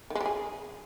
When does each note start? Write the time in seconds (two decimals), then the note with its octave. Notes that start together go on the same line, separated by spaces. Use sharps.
0.10 D#3
0.15 G#3
0.21 G3
0.26 G#4